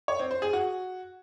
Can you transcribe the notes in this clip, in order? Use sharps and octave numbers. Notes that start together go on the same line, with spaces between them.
C#5
C4
C5
G#4
F#4